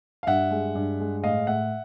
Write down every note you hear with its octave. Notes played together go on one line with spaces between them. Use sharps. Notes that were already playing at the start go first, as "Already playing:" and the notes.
F5
G2 E5 F#5
G#3
G2
G#3
A2 D#5 F5
A2 E5 F#5